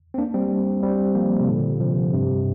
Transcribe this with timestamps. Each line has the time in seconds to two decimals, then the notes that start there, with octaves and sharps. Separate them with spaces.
0.14 C4
0.18 A#3 D4
0.34 G3 C4
0.83 G3 C4
1.15 F3 A#3
1.41 C3
1.48 A#2 D3
1.80 C3 F3
2.13 G2 C3